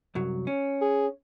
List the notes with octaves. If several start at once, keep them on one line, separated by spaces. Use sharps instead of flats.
C2 F#2 F#3
C#4
G#4